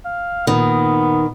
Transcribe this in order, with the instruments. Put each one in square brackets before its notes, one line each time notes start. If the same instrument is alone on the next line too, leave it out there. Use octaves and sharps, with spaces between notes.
[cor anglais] F5
[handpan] A#2 D#4 [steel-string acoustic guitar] D#3 [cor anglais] B3